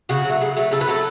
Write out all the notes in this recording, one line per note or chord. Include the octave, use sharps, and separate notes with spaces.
C#3 F#4
F#3 A3
C#3
F#3 A3
C#3 A4
B4
F#3 A3 A4